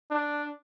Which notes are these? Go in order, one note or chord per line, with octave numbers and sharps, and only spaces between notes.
D4